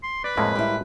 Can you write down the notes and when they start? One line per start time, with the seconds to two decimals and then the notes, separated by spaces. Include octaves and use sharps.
0.03 C6
0.24 B4 D5
0.37 F2 A2 G#3 A#3
0.55 G3 E4